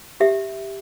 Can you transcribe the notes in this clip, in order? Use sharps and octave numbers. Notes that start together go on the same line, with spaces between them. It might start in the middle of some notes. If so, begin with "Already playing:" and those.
G4 E5